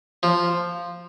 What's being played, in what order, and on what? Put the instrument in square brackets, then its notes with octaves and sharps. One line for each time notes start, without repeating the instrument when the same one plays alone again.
[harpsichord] F3